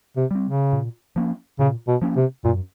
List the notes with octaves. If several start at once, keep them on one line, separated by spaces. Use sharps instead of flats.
C3
G3 C4
C#3
A#2
F3 A#3 C#4
A#2 C#3
B2
F3 A#3 C#4
C3
F#2 A#2